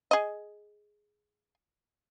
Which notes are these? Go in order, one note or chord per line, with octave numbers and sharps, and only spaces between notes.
G#4 D#5